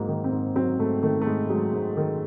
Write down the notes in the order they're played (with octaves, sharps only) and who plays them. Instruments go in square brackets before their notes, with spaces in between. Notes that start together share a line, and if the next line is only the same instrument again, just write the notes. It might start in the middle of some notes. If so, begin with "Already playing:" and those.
Already playing: [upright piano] G#2 F#3 A#3
D#3
C4
G#2
F#3 C4
G#2 A3
D#3 A3
A3
G#2 G#3
F#3 G#3
G#2
D#3